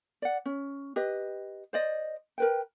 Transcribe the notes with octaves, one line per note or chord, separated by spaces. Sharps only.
D5 F#5
C#4
G4 B4 D#5
C5 D5 D#5
A#4 B4 G5